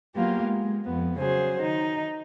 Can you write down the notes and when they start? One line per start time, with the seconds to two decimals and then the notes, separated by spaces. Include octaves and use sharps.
0.15 F#3 A#3 B3 F4 G4
0.44 G#3
0.86 F2 B3
1.18 C#3 F#3 G#4 C5
1.62 D#3 D#4